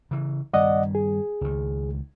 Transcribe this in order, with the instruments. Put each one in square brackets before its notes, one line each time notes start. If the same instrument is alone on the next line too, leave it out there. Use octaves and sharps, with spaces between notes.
[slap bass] C#3 E3
[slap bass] G2 D#3 G3 [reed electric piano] D5 D#5 F#5
[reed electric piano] G#4
[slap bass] C#2 D#3